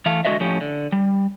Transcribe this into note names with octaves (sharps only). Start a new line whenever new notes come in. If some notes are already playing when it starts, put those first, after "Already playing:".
E3 A3 F5
D3 G#3 F#4 B4 D#5 E5
A2 F3 C#4 G4
D3
G3